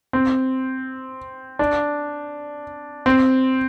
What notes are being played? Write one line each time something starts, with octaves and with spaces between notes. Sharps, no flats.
C4
D4
C4